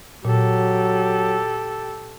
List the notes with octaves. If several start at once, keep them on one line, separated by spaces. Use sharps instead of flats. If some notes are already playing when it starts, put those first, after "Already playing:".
A#2 F#3 G4 A4